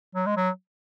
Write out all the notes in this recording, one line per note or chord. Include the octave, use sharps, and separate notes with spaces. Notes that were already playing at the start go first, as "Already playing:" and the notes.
F#3
G#3
F#3